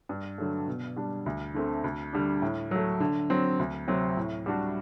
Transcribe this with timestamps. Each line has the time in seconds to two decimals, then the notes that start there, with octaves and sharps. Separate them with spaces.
0.09 G2
0.38 D3 F#3 A3
0.68 B2
0.96 G3 D4
1.26 D2
1.54 D3 A3 C4
1.84 D2
2.13 D3 G3 D4
2.42 A2
2.71 F#3 A3
3.00 D3
3.30 F#3 C4
3.59 D2
3.88 C3 F#3 C4
4.17 A2
4.46 G3 D4 F#4